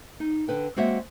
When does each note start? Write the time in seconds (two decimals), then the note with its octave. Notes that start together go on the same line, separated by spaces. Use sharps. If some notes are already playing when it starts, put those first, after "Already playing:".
0.20 D#4
0.48 D3 B4 G5
0.76 G#3 A#3 C4 F#4 C#5 E5